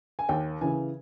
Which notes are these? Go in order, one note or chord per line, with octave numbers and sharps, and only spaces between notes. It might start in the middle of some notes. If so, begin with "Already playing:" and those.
G#5
D#2 G5
C#3 E3 G#5